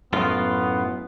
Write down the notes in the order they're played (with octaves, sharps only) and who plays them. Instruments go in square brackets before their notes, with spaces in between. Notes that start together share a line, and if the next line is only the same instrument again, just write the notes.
[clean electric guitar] F#2 A2 F4 [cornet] B3